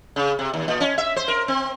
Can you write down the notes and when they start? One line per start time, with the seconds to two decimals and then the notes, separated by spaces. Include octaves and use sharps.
0.16 C#3
0.39 C3
0.54 D#2
0.68 A#2
0.80 C#4
0.98 E5
1.16 C5
1.28 A#4
1.48 C4